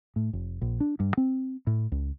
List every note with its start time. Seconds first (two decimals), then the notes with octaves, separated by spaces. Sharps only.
0.16 A2
0.33 F1
0.61 A#1
0.80 D4
1.00 G2
1.17 C4
1.67 A2
1.92 C#2